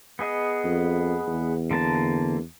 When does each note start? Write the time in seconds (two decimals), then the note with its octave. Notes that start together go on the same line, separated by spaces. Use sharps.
0.19 B3 G#4 D#5
0.64 F2
1.28 E2
1.71 D3 A#3 A5